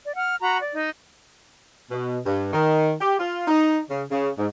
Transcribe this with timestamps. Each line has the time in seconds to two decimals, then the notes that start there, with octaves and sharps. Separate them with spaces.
0.05 D5
0.16 F#5 F6
0.40 F#4 A#5 B5
0.60 D5
0.74 D#4
1.91 B2
2.26 G2
2.53 D#3
3.00 G4
3.18 F4
3.47 D#4
3.90 C#3
4.10 C#3
4.38 G#2